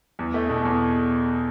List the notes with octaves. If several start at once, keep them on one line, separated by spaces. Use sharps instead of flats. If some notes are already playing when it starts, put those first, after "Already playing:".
E2
A3
B2
E2